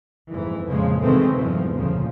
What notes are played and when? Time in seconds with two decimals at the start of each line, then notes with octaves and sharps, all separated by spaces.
0.31 F2 G#2 E3
0.66 F2 A#2 C#3 F3 G#3
1.02 C3 D#3 E3 G#3 A3 C4
1.34 E2 G2 F3
1.75 D2 A#2 C#3 F3